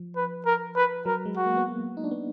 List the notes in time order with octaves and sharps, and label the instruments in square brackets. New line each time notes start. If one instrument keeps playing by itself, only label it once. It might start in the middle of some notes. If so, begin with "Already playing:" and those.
Already playing: [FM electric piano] F3
[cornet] B4
A#4
B4
[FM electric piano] F#3 [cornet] A#4
[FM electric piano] G#3
[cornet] F#4
[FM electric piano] A#3
B3
A#3
D#4
D4
B3